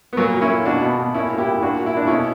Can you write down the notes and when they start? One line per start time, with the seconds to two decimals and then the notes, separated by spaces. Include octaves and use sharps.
0.13 B3
0.17 A#2 F#3 A#3
0.34 A#2
0.42 C#4 E4
0.50 A#2
0.65 B2 D4 F#4
0.82 B2
0.98 B2
1.14 A#2 C#4 E4
1.30 A#2
1.38 E4 G4
1.46 A#2
1.62 A#2 D4 F#4
1.78 A#2
1.86 E4
1.95 A#2 D4
2.07 B2 C#4 E4